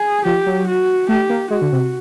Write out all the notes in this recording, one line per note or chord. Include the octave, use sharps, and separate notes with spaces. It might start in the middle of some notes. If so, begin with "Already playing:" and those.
Already playing: G#4
F3 G4
F#3
F#4
A3 G4
A#3
G#3 F#4
D3
C3